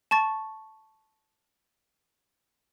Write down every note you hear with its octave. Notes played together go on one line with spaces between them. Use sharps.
A5 C#6 A6